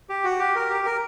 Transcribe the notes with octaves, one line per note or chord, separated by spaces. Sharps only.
G4
F#4
G4
A#4
G4
A#4